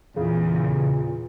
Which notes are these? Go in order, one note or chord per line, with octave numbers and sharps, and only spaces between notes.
E2 A#2 C#3